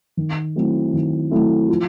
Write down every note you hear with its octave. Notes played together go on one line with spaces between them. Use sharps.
D#3
F#3 A3 C4 E4
D#3
F#3 A3 C4 E4
F3